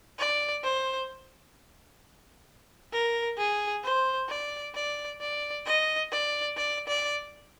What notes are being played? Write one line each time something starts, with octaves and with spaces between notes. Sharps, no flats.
D5
C5
A#4
G#4
C5
D5
D5
D5
D#5
D5
D5
D5